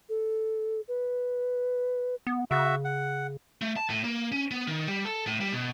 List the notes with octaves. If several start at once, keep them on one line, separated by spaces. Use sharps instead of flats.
A4
B4
B3
C#3 F#4 E5
F#5
A3
A5
A2
A#3
C#4
B3
D#3
G3
A4
A2
G3
B2